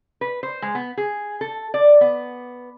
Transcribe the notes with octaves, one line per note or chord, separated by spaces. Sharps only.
B4
C5
G#3
B3
G#4
A4
D5
B3